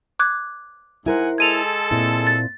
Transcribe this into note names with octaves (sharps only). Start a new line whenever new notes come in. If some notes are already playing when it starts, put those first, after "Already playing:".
D6 F#6 G#6
G#2 E4 A#4 C5 F#5 G#5
G#3 A4 G#6 D#7 F7
A#2 C4 E4
A6